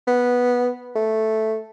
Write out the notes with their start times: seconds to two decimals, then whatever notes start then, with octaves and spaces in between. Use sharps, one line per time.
0.07 B3
0.95 A3